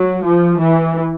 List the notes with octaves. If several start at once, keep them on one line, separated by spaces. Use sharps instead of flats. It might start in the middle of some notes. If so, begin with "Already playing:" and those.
Already playing: F#3
F3
E3